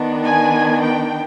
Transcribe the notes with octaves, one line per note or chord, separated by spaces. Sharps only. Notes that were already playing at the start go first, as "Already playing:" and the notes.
Already playing: D#3 B3 D4
G#5
G5